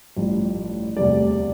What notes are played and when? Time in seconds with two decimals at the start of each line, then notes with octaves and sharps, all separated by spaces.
0.16 A1 G2 F3
0.97 E1 D2 C3 G3 D5